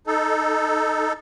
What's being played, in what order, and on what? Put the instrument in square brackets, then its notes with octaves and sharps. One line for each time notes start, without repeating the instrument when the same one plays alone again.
[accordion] D#4 A4